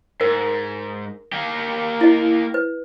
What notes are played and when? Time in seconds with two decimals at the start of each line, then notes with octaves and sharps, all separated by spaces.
0.21 G#2 A#4
1.33 A#3 G4
2.01 E4 D#5
2.54 B4